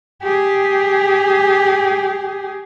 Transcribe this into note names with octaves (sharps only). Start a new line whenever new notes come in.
G4 G#4